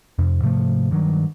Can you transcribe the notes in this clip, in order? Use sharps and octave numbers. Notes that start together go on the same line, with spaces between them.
F2 C3
G#2 C3 F3 A3
G2 D#3 F#3